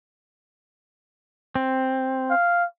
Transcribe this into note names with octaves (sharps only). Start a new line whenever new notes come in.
C4
F5